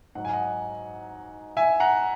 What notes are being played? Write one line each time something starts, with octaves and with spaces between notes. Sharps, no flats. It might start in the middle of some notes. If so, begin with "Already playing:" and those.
G#2 F#3 F#5
G#5
D#5 F#5
E5 G#5
F#5 A#5